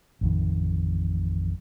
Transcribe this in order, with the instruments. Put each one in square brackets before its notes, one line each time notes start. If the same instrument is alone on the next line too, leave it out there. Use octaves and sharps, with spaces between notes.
[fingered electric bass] A1 F2 D#3